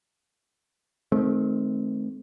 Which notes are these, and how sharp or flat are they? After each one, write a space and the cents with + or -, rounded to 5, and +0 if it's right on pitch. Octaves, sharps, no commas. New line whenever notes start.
D#3 +0 A3 -35 C4 +0